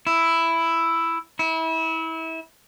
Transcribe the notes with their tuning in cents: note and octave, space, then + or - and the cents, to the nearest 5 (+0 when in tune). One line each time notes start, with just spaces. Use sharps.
E4 +5
E4 -25